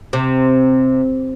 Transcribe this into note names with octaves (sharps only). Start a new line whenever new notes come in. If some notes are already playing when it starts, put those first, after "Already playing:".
C3